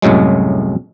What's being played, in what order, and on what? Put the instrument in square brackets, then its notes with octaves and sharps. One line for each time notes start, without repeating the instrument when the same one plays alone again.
[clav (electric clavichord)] C2 F#2 A2 F#3 G#3